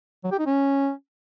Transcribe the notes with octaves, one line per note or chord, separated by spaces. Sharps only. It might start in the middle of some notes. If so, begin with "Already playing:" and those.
F#3
G4
D#4
C#4